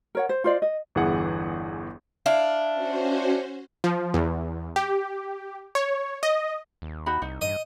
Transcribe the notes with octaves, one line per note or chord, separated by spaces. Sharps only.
A#4 C#5 F#5
C5
F4 C5 D5 D#5
D#5
G1 E2 E3 G#4 F#5
D4 E4 F5
C#4 F#4 C5
F3
E2
G4
C#5
D#5
D#2
D#4 F#4 B5
C2 D#4
G2 D#5